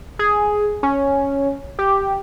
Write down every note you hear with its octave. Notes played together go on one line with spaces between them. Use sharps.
G#4
C#4
G4